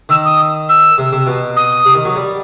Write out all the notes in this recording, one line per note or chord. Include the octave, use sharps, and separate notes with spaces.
D#3 E6
D#6
E6
C3
C3
B2
D#6
C3
D#3
F#3
G3